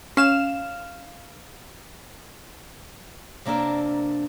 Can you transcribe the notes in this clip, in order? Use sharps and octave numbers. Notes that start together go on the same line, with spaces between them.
C#4 F5 E7
C3 A#3 D4 A4 A#4